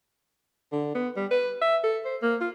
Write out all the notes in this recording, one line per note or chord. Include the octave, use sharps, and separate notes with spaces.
D3
B3
G3
B4
E5
A4
C5
A#3
F4